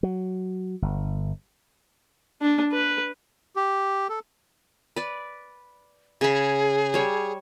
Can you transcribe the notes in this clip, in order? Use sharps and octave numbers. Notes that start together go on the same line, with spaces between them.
F#3
G1
D4
B4
G4
A4
B4 D5
C#3 G#4 B5
G3 C#5